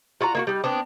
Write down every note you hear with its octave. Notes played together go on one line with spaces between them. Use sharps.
F4 F#4 D5 A#5
A#3 E4 F#4
G3 D#4
B3 C4 D4